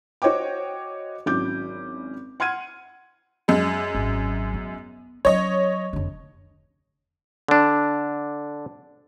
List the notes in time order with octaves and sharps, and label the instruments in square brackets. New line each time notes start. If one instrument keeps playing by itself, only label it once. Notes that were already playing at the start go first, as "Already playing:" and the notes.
[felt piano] F#4 C5 C#5 D#5 G5 D6
G#1 F#3 C#4 E4 D6 G6
F#5 C6 F6 G#6 D#7
[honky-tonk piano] F#2 G#3
[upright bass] G#1
B3
[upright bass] F#3 C#4 [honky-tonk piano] C#5 D#5
[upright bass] F1 D3
[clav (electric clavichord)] D3 D4